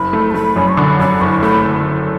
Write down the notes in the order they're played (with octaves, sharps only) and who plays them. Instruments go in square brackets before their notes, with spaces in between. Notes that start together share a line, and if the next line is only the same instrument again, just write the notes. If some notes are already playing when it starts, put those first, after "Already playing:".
Already playing: [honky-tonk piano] F#1 [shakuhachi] B5
[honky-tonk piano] A3
[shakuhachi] A5
[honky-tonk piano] A3 [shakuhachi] B5
[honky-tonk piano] F#2
[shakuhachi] C#6
[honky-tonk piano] D3 [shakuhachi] B5
[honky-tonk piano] F#2 [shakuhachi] B5
[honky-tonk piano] F#1 [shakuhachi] C#6
[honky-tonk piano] A3 [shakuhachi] B5